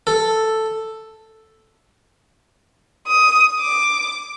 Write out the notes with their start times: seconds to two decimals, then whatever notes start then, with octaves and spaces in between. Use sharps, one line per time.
0.07 A4
3.06 D#6
3.60 D6